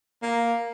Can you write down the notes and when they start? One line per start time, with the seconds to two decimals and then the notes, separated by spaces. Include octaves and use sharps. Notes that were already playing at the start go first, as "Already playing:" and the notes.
0.22 A#3